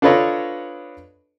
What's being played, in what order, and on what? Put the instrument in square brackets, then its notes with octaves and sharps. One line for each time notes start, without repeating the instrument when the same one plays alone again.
[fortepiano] D4 F4 A4 B4 C#5 D#5